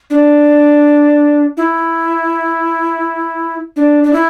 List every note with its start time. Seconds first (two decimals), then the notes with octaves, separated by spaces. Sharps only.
0.10 D4
1.57 E4
3.76 D4
4.04 D4
4.13 E4